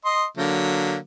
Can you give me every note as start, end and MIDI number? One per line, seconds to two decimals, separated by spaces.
0.05 0.25 75
0.05 0.25 84
0.37 0.97 50
0.37 0.97 54
0.37 0.97 58